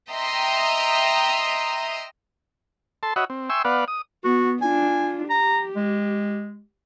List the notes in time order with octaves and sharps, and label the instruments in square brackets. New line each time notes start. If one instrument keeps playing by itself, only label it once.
[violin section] D#5 E5 G5 A#5 C6 D#6
[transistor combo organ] A4 A5 C6
F#4 C#5 D#5 E5 F#5 B5
C4
E5 G5 G#5 C6 C#6 E6
B3 B4 D5 F5 F#5
D#6
[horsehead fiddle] B3 [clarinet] F#4
[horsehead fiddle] D4 F4 [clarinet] G#5
[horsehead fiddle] G4 [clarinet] A#5
[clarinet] G#3